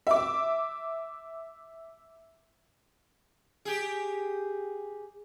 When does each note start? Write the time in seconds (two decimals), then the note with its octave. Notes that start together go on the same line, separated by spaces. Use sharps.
0.07 E5 D6
3.65 G4 G#4